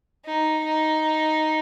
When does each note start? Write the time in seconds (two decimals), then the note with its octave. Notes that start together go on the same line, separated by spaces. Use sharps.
0.25 D#4
0.64 D#4